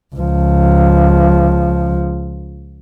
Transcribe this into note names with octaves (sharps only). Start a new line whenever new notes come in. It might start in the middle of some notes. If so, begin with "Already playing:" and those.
C#2 F3